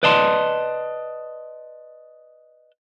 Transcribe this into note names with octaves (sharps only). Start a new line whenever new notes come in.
B4 D5 D#5 A5 B5 C6